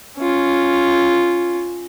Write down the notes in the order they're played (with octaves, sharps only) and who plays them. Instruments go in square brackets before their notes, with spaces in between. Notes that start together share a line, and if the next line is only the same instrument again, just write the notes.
[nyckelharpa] C#4 F4